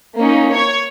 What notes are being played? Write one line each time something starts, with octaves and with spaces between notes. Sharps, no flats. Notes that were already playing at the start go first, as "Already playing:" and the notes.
A#3 C#4 D#4
C#5 G#6